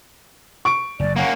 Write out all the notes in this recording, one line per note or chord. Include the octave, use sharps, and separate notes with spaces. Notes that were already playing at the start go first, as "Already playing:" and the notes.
C#6 D7
F#1 F#2 D5
A#3 C#4 F#5